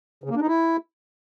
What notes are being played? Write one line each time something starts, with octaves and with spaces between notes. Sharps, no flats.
C#3
A#3
D4
D#4
E4